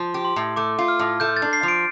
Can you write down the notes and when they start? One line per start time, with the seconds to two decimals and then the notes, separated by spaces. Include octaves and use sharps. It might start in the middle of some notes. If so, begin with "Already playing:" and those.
Already playing: F3
0.14 G4
0.25 C6
0.36 A2
0.56 A3 D6
0.78 F4
0.88 F6
0.99 A2
1.20 A3 G6
1.37 A6
1.42 D4
1.53 C7
1.63 F3
1.68 D7